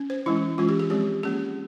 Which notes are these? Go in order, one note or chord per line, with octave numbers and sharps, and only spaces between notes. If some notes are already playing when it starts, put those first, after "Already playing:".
Already playing: C#4
C5
E3 G#3 C#4 E4
E3 G#3 C#4 F4
G4
G#4
F3 G#3 C4 G4
F3 A#3 C#4 G#4